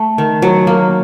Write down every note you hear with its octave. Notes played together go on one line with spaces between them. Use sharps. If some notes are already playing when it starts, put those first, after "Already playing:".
Already playing: A3
D#3
F#3
A#3